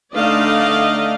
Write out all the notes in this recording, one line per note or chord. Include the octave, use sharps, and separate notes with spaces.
D3 A3 D#4 D5 D#5 F5